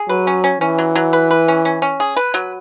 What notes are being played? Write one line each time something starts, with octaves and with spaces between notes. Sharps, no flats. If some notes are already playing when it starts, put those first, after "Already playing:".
Already playing: G#4
F#3 B4
C#4
C#4
E3 C#4
F#3
F#3
B4
B4
C#4
C#4
C#4
G#4
B4
F#3